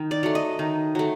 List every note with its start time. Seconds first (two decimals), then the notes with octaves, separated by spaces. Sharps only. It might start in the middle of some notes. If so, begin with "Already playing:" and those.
Already playing: D#3
0.11 D5
0.23 F#3 A3
0.35 D#5
0.59 D#3
0.95 F#3 A3